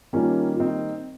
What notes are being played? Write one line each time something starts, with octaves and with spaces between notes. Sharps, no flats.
D#3 G3 A#3 C#4 F4
F4
C4 D#4